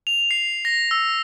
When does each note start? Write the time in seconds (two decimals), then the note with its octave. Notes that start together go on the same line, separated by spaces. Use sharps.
0.07 F7
0.31 C7
0.65 A#6
0.91 E6